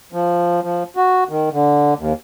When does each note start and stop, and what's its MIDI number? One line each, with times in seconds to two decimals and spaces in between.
0.13 0.60 53
0.63 0.83 53
0.96 1.24 66
1.29 1.49 51
1.52 1.94 50
1.99 2.13 39